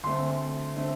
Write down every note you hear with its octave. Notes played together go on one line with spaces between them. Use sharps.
D2 D3 A3 C4 C6
D3 A3 C4